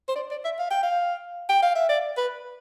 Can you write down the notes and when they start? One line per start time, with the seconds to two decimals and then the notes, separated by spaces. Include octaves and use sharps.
0.09 C5
0.16 D5
0.31 D5
0.45 E5
0.59 F5
0.71 G5
0.83 F5
1.49 G5
1.63 F5
1.75 E5
1.89 D5
2.18 B4